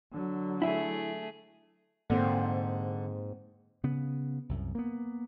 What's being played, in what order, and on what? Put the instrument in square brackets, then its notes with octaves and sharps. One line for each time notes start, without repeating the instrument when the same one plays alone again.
[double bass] D3 F#3
[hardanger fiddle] A3 G#4 [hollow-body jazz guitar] E4 E5
[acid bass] G#2 [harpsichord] D3 [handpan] A#3 C4 C5
[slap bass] C#3 B3
C2 F#2
A#3 B3